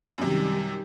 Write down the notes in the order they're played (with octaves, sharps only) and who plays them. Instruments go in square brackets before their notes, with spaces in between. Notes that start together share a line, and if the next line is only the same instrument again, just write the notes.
[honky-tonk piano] F#2 C3 [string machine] D#3 G3 G4